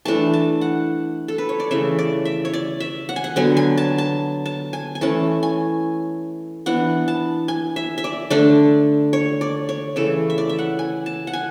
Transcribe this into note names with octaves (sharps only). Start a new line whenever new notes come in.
E3 A3 D4 A5
A5
F#5
A4
B4
C#5
D5
C#3 E3 A3 E5
D5
E5
C#5
D5
E5
F#5
G#5
F#5
D3 F#3 B3 G#5
G#5
A5
A5
A5
G#5
G#5
E3 A3 C#4 A5
G#5
E3 B3 D4 F#5
A5
G#5
E5
E5
D5
D3 A3 D4 D5
C#5
D5
C#5
C#3 E3 A3 A4
E5
D5
E5
F#5
G#5
A5
F#5
G#5